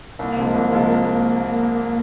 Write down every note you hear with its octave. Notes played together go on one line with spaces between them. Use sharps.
C2 A#3
C3 F3 G#3
C2 A#3
C3 F3 G#3